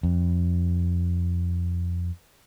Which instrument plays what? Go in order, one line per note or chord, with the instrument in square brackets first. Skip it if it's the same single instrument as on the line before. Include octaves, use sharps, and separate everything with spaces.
[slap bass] F2